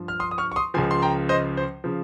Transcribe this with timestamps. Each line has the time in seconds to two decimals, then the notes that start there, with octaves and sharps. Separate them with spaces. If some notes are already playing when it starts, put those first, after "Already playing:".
Already playing: G2 F3
0.08 F6
0.20 C6 D#6
0.31 D#6
0.38 C#6 F6
0.52 C#6
0.56 C6 D#6
0.74 C#2 C#3 F3 G#5 C6
0.91 C6
1.02 G5 A#5
1.29 C5 D#5
1.57 C5
1.84 C#3 F3